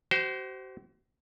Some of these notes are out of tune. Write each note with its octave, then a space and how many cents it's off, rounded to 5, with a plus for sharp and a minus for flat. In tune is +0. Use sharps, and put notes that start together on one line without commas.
F#4 +45 C5 -10